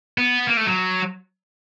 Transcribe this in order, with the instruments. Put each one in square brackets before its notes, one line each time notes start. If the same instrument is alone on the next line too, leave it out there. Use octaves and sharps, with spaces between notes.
[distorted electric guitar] B3
A#3
A3
F#3